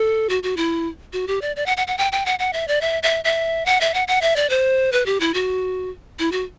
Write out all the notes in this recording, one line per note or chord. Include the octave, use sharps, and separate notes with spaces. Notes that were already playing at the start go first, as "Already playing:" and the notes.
Already playing: A4
F#4
F#4
E4
F#4
G4
D5
D5
F#5
F#5
F#5
G5
G5
F#5
F#5
E5
D5
E5
E5
E5
F#5
E5
F#5
F#5
E5
D5
C5
B4
G4
E4
F#4
E4
F#4